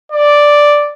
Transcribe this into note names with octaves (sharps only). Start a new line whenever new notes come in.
D5